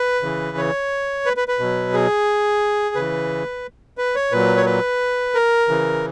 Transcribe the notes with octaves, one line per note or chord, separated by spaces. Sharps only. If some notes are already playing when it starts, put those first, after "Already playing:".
Already playing: B4
C#3 E3
C#5
B4
B4
B4
B2 F#3
G#4
C#3 E3 B4
B4
C#5
A#2 F#3 B4
C#5
B4
A#4
C#3 E3